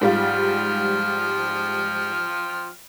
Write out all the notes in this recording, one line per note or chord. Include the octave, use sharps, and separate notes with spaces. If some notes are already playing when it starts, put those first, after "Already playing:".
G#2 F3 G3 F4 G5 F6